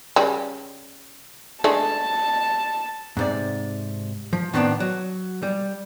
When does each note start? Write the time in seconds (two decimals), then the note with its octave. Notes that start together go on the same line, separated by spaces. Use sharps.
0.16 C#3 G3
1.64 G#3 A3 D4 A5
3.17 G#2 C3 D5
4.33 F3
4.54 A2 D#3 B3 C4 D4
4.80 F#3
5.43 G3